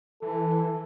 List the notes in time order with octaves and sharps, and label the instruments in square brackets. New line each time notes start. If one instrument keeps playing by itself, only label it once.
[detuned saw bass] E3 [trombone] A4